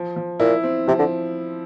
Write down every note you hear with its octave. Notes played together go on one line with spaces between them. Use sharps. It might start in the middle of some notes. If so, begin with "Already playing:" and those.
Already playing: F3
F3
A#2 E4
C4
C3 F3
D3